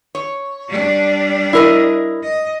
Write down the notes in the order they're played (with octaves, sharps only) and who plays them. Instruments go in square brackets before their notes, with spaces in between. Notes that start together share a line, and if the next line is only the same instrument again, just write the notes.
[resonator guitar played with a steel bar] C#5
[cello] G3 D4
[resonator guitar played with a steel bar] E4 A#4 D#5
[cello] D#5